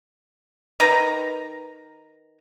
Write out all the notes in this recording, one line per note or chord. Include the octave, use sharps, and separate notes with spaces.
D#3 B4 A#5